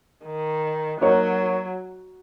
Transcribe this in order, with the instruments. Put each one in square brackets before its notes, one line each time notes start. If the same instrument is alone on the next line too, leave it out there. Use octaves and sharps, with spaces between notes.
[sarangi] D#3
[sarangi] F#3 [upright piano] A#3 D#4 F#4 C#5